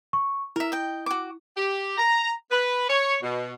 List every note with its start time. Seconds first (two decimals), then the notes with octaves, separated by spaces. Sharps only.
0.13 C#6
0.56 E4 A#4 E5
0.72 D#5 G5
1.06 F#4 D6
1.57 G4
1.98 A#5
2.52 B4
2.89 C#5
3.22 B2